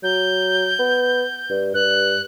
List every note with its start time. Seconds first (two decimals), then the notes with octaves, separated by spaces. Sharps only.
0.03 F#3 G6
0.79 B3
1.50 G2
1.74 G2 F#6